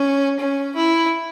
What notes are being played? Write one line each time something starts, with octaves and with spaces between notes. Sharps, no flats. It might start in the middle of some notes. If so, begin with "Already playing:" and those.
Already playing: C#4
C#4
E4